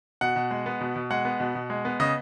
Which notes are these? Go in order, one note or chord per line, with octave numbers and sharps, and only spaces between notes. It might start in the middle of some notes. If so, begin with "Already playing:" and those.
B2 F#5
B2
G#3
B3
B2
B2
G#3 F#5
B3
B2
B2
G#3
B3
C#3 D#5